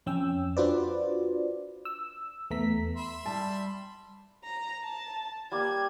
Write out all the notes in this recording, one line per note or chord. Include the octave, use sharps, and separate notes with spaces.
F2 C#4 G5 E6
D4 F4 F#4 B4 C5 D5
E6
E2 A3 B3 A#5 B6
E5 B5 C6
G3 A5
A#5
A5
G3 A#3 D5 G#6